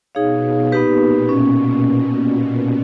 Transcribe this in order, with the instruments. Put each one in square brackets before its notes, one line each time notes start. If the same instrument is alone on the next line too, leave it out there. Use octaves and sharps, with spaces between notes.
[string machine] B2 [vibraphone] D#4 G#4 C#5 F5
[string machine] B2
[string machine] A#2 [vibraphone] B3 D#4 G4 B4
[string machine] B2
[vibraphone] C#4